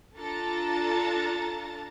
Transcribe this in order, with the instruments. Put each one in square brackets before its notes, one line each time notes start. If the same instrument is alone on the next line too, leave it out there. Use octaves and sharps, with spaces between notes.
[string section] D4 F4 A4 A5 A#5 A6